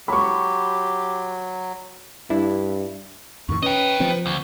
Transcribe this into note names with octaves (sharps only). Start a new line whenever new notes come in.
F#3 G4 B5 C#6
G2 D4 E4
F2 A2 D#3 C#6
C#4 B4 D#5 G5
F3 C4
D2